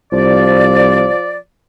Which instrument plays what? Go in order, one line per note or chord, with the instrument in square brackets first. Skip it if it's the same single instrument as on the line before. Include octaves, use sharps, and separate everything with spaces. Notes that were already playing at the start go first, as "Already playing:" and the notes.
[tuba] C2 [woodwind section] F3 D5